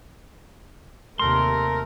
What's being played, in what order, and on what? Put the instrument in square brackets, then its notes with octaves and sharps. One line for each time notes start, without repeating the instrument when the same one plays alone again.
[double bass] D#2 C3 [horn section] A3 A#4 [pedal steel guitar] C6